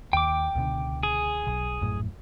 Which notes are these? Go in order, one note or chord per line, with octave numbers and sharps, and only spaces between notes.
D#2 G5 D6
C#2 B2 D3
G#4
B1
A#1 F#2 A2